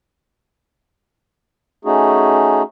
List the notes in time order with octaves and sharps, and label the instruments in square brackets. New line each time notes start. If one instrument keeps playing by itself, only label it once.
[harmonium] A3 C#4 D#4 F#4 G#4